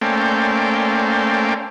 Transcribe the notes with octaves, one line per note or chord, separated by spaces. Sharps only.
A3 A#3 C#4 C5 D5 G5